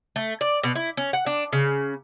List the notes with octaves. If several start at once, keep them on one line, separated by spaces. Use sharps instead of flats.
A3
D5
B2
E4
C#4
F#5
D4
C#3